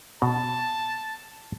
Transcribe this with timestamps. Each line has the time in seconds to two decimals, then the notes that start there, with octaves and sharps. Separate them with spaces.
0.22 B2 A5